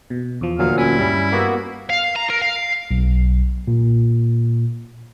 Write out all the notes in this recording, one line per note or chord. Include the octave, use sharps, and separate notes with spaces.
B2
E2 F3
D2 A#2 F#3 F5
C#4 E4 G#5
G2 G3 C#4
A#3 B3 F#4
F5
A#5
A#4
F5
B1
A#2